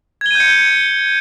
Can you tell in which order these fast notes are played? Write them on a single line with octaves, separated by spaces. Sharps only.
G#6 G7 D#7 G6 C#7